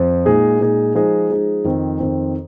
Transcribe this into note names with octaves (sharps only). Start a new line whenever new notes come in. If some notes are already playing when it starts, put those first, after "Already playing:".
Already playing: F2 F3
A#2 G#3 D#4 G#4
A#2 G#3 D#4 G#4
F3 G#3 D#4 G#4
F3 G#3 D#4 G#4
F2 D#3 C4
F2 D#3 C4